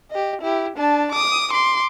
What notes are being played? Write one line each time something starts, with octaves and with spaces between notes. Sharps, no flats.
G4 D#5
E4 G4
D4 A5
D6 D#6
C6 D6